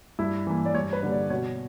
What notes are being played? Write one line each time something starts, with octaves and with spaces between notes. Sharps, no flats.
G2 E4
E3 A#3
D5
G2 C#5
B4
D3 G3 A#3
D5
B2 C#5